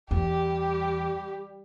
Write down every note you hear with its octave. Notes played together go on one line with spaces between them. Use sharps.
E2 G3 G4